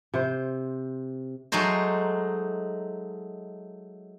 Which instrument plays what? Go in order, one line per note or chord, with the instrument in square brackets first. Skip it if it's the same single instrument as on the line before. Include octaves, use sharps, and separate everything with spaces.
[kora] C3 C5
[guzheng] F#3 G#3 A3 D#4 C5